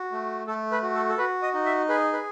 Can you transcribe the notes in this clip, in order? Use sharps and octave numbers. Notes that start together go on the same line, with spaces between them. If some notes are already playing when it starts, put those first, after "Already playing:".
Already playing: F#4
A3
A3 A4
B4
F#4
A4
A4
F#4 B4
D#5
D#4
E5
G#4 B4
B4